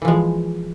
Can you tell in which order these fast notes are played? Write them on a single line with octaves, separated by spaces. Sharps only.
E3 F3 G#3